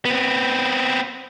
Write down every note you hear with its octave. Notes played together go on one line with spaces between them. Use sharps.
B3 C4